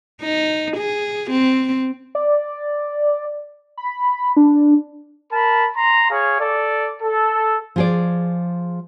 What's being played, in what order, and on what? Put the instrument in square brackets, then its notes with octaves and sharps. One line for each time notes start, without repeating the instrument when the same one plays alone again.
[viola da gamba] D#4
G#4
C4
[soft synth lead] D5
B5
D4
[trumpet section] A#4 A5 B5
A#5 C6
G#4 C#5 F5
A4 D5
A4
[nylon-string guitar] F3 G#4 D5